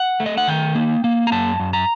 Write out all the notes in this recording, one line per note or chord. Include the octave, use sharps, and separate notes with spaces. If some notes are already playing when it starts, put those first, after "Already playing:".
Already playing: F#5
A3
D#5
F#5
D#3 G5
A#3
A#3
A#5
F#2 A5
F#2
A#5